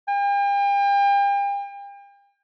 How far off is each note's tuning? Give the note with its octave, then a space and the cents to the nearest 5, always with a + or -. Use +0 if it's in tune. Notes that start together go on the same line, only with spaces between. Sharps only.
G5 +40